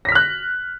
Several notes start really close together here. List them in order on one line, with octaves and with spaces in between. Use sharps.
A#6 B6 F6 F#6